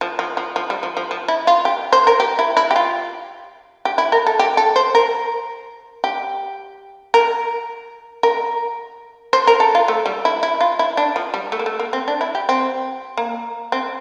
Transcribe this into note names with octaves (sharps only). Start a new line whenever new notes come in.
F3
F3
F3
F3
G3
F3
F3
F3
E4
F4
G4
C5
A#4
G4
E4
E4
G4
F4
G4
E4
A#4
A4
G4
A4
C5
A#4
G4
A#4
A#4
C5
A#4
A4
F4
A3
G3
E4
E4
F4
E4
D4
F3
G3
A3
A#3
A3
A#3
C4
D4
E4
G4
C4
A#3
C4